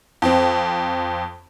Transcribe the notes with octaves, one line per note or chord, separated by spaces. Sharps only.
F2 C4